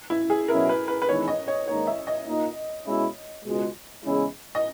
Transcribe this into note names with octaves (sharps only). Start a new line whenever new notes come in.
E4
G#4
B2 F#3 C#4 E4 A#4
B4
B4
B4
E2 D#3 G#3 C#4 E4 C#5
D#5
C#5
G#2 D#3 A#3 D#4 C#5
E5
D#5
A#2 A#3 D#4
B2 G#3 C#4 E4
C#2 B2 G#3
E2 C#3 G#3 C#4 E4
D#5